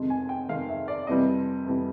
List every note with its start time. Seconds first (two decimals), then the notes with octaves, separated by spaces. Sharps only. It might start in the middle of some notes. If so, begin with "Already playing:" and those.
Already playing: F2 C3 D#3 G#3
0.10 G#5
0.29 G5
0.48 F2 C3 D#3 G#3 F5
0.69 E5
0.88 D5
1.07 F2 C3 E3 G3 D#5
1.67 F2 C3 E3 G3